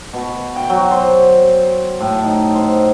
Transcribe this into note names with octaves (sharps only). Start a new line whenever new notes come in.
B2
G5
F#3
C5
A2
D#4
C5